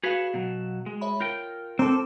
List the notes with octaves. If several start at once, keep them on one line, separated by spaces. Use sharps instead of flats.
F#4 G#4 B4 C#5 F5 E7
B2 F#3
G#3
C#5 E5 B5
F4 A#4 G5 G6
C4 A4 A#5 C6 D6